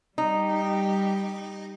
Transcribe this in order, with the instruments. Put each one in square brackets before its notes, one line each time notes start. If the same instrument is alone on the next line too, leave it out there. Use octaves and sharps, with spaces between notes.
[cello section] G3 G4 [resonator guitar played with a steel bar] D#4